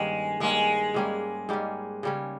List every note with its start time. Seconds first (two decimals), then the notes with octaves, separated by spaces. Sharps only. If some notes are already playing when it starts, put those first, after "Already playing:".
Already playing: G2 D#3 G#3 A#3 C#4
0.40 G2 D#3 G#3 A#3 C#4
0.94 G#2 G3 A#3 C#4
1.49 G#2 G3 A#3 C#4
2.03 C#3 G3 C#4